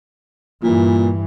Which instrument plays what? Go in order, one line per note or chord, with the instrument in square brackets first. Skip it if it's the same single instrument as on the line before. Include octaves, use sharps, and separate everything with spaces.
[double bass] G2 E3 [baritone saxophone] A#2